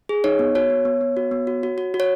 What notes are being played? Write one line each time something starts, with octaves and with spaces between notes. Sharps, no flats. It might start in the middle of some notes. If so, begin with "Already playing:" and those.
G#4
D#4 C#5
B3
F#4 C#5
B3
B3
B3
F#4
B3
F#4
F#4
F#4
F#4
C#5